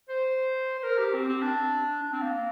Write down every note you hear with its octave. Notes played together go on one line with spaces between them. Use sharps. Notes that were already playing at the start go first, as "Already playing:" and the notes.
C5
C5
A#4
G4
C4
C4
D4
D4
C4
A#3